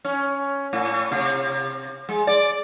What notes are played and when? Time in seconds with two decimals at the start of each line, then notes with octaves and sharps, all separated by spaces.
0.05 C#4
0.73 A2
1.12 C3
2.09 G#3
2.27 D5